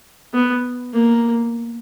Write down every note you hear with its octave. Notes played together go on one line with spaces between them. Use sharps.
B3
A#3